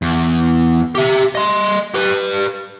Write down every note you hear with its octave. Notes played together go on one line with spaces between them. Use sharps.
E2
G4 E5
D#5 C6
G4 B4